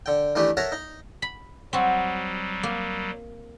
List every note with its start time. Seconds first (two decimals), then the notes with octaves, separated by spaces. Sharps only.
0.06 D3 G5
0.35 D#3 E3 A3 D4 G4
0.57 A4 A#4 C#5 E5 F#5 A#5
0.72 D#4
1.22 B5
1.73 F#3 G3 C4 F#4
2.63 A#3